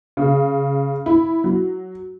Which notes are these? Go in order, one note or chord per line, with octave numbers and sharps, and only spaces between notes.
C#3
E4
F#3